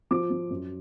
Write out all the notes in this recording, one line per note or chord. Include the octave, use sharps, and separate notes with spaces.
F3 D6
F3
F#2